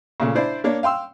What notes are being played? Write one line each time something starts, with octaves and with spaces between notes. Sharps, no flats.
A#2 C#3 A3
D4 E4 C5 D5
A#3 D4 C#5
F5 G5 C6 E6